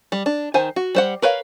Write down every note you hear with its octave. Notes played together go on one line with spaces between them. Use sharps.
G3
D4
D#3 C5 G#5
F#4
G3 C5 F#5
A#4 B4 C#5 F5